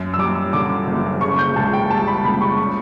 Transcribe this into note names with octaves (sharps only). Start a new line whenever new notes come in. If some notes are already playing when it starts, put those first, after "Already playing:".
Already playing: F#2
E6
G3 D6
D3 D6
F#1
C#3 C#6
G6
C#2 A5
G5
G3 A5
B5
C#2 B5
C#6
C#3